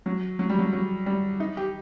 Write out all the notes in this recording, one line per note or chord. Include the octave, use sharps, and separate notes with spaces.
F#3
F#3
G3
F#3
F#3
G3
D#4
G4